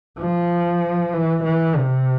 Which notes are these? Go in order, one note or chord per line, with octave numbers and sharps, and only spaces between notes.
F3
E3
E3
C3